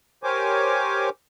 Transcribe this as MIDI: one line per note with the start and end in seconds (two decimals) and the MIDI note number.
0.24 1.09 67
0.24 1.09 70
0.24 1.09 72
0.24 1.09 73
0.24 1.09 80
0.24 1.09 86